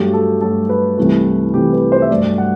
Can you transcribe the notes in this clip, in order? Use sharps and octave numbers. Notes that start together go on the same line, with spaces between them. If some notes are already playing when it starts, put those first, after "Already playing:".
Already playing: G2 F#3 A3 G4
A4
G2 F#3 A3 A4
B4
C2 C3 E3 A3
C2 C3 E3 A3 G4
B4
C5
E5
G2 F#3 A3 D5
F#5